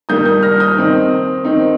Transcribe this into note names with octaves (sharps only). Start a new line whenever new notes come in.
D#3 G3 A#3 D#6 G6
D#6 G6
F6 A#6
D#6 G6
D#3 C4 D#4
D#3 C4 D#4